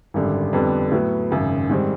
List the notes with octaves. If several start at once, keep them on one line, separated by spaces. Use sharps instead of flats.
G#1 F#2 D3 G3
F2 D3 G3 B3
A2 F#3 B3
G#1 F#2 C#3
G#2 D#3 G3 C4